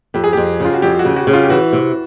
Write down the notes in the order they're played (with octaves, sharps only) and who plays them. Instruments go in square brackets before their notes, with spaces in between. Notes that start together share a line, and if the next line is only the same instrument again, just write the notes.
[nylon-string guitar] F2 [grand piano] G4
[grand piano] G#4
[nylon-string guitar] F2 [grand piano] G4
[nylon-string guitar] C#3 [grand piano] F4
[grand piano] F#4
[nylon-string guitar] F2 [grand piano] G4
[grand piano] F#4
[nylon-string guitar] C#3
[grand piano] F#4
[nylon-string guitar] C#3
[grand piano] F4
G4
[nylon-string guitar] E3 [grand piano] F#4
[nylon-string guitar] C3